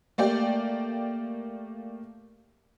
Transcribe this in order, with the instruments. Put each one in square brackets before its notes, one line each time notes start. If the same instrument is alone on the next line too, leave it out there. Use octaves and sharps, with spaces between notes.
[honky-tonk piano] A3 A#3 G4 D5 G5